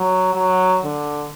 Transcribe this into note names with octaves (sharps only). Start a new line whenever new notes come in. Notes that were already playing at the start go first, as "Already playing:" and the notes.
Already playing: F#3
F#3
D3